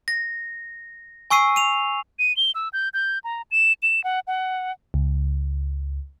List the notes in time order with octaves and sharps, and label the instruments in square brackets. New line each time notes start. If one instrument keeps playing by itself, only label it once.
[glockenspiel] A#6
G#5 C#6 E6 C7 D#7
D#7 F7
[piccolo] D#7
G7
E6
G6
G6
A#5
E7
E7
F#5
F#5
[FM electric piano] C#2